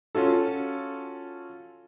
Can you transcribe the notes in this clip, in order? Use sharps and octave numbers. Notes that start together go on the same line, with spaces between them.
C#4 F4 F#4 A4